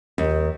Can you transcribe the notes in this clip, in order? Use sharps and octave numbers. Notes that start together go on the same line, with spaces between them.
D#2